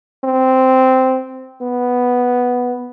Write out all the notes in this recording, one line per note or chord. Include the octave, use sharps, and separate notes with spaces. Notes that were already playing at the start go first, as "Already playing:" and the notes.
C4
B3